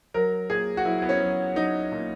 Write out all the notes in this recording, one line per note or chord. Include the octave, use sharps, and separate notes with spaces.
F#3 A#4
A#2 G#4
F#4
F#3 E4
B3
C#4
F#3
F#3 D#4
A#2